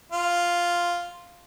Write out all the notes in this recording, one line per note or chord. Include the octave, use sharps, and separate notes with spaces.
F4